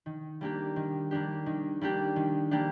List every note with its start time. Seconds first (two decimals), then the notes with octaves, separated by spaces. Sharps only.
0.06 D#3
0.41 G3 A#3 D4 G4
0.76 D#3
1.11 G3 A#3 D4 G4
1.46 D#3
1.81 G3 A#3 D4 G4
2.16 D#3
2.51 G3 A#3 D4 G4